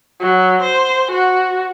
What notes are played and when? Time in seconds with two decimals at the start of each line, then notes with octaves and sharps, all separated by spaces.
0.20 F#3
0.62 C5
1.11 F#4